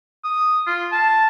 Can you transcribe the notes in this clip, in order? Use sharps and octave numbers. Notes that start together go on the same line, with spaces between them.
D#6
F4
A5